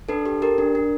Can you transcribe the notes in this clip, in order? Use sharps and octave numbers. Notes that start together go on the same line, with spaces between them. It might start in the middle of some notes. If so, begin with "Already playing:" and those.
D4 A4 B4
G4 A4
G4 A#4
D4
D4